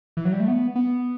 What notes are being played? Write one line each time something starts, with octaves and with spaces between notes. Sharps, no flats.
E3
F#3
G3
A3
B3
B3